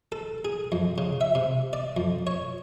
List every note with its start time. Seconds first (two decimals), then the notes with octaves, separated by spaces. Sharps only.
0.12 A4
0.45 G#4
0.72 F2
0.98 C#3
1.21 E5
1.35 C3
1.73 D5
1.97 F2
2.27 C#5